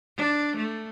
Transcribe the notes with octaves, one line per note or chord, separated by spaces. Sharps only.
D4
A3